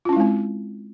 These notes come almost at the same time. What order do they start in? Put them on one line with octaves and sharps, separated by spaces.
F4 C#4 E4 G#3 C4